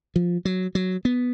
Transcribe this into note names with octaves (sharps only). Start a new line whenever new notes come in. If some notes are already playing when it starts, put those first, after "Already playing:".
F3
F#3
F#3
B3